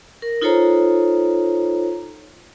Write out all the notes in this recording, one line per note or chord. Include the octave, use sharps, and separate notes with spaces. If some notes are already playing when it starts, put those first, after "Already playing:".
A#4
D#4 F4 A4 C5 C#5 A#5